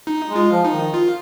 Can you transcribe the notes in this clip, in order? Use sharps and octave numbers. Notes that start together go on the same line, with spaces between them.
D#4
G#3
F4
F3
D#4
D#3
F4